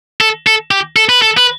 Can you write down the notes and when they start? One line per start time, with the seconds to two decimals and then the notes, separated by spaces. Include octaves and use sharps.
0.21 A4
0.47 A4
0.71 G4
0.96 A4
1.09 B4
1.22 A4
1.37 B4